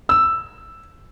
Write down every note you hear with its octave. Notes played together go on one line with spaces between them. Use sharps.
E6